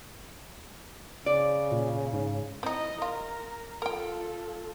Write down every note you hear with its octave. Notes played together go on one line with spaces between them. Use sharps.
C#3 D5
A#2
G#2
C4 D#4 E4 D#5
F4 A#4
F4 A4 A#4 G5